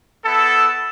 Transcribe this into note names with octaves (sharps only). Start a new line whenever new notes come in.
B3 E4 A4